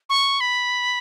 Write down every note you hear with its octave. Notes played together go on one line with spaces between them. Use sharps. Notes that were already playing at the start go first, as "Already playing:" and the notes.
C#6
B5